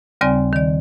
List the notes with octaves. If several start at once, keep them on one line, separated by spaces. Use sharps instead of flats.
D#2 C#3 G3 C4 D5 G#5
D#3 D5